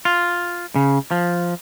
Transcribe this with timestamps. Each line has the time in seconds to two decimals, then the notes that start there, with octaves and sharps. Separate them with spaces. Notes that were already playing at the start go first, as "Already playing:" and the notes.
0.05 F4
0.75 C#3
1.11 F3